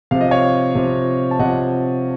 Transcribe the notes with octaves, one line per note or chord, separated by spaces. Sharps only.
C3 F3 F5
D#5
C#5 F5
C3 F3
A5
C3 F3 D#5 F#5